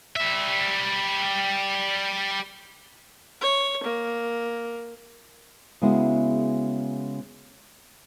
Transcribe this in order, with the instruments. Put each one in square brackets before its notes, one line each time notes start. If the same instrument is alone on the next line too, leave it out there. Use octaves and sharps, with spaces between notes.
[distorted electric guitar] G3 E5
[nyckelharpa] C#5
A#3
[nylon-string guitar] C#3 G#3 B3 E4 F#4